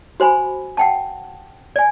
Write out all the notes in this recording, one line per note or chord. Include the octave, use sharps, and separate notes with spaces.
F#4 C5 G#5 B5
F#5 G5 A5
D5 G#5